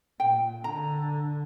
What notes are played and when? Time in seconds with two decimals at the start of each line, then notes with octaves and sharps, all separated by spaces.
0.20 A#2 G5
0.64 D3 A#5